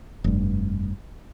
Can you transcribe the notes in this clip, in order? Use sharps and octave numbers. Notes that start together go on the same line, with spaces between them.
F1 G2